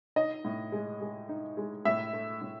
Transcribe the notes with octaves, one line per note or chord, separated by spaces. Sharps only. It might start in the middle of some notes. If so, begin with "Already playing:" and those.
D#4 D#5
A2
G#3
G#3
D#4
G#3
A2 E5
A3
A2